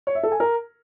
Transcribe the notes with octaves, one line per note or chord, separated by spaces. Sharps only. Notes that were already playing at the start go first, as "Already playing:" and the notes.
C#5
E5
A4
G#5
A#4